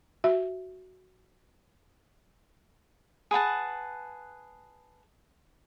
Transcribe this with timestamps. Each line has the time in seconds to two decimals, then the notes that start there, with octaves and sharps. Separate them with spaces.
0.24 F#4 E5
3.31 G#4 B4 F#5 A5